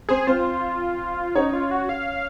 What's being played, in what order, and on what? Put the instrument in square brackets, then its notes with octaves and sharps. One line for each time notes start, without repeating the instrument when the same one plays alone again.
[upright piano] C4 C5 [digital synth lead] G#4
[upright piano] C4 C5 [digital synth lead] F4
[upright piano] C#4 C#5 [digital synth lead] D#4
[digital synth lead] F4
F#4
F5